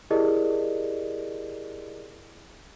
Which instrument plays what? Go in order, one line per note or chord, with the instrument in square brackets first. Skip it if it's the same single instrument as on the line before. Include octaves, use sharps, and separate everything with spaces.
[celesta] E4 G4 G#4 A#4 D5 D#5